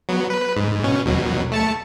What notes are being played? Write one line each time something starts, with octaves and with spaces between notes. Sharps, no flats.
F#3 B3
B4
G#2
B2 C#4
D#2 B2 F#3
A3 A5 C#7